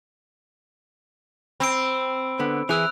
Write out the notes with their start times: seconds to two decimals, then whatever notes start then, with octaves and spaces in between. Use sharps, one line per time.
1.60 C4 B5 E6 D7
2.39 D3 B3
2.69 E3 E4 G#4 E6 F#6 F7